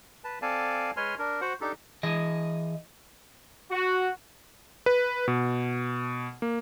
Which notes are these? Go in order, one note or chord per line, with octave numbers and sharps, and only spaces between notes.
B4 A5
C4 A4 D5 F5 G#5 A5
G#3 B4 C#5 G#5 C6 F6
D4 A#4
F#4 C5 F#5
D4 D#4 G4 A4
E3 G#4 D#5
F#4
B4
B2
A#3